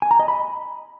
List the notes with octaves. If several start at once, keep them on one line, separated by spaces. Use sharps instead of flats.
G#5
A#5
D#5
B5